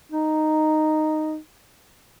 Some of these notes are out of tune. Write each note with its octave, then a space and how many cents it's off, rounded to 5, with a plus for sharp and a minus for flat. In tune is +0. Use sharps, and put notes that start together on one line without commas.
D#4 -5